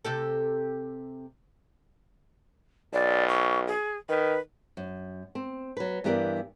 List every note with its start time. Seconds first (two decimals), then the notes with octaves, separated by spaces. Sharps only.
0.05 C3 G4 A4
2.93 B1 D5
3.29 C#6
3.67 G#4
4.09 D#3 B4
4.77 F#2
5.35 C4
5.77 F#3 B4
6.04 G2 E3 B3 G4 A#4 D5